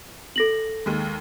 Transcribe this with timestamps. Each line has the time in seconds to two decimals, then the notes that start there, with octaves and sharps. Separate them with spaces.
0.36 A4 A#6 F#7
0.86 D#2 G#3